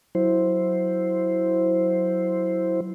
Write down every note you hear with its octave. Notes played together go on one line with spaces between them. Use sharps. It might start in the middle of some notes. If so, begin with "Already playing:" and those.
F#3 E4 C5